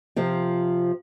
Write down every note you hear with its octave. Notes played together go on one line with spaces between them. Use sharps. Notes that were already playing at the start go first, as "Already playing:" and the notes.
C3 F3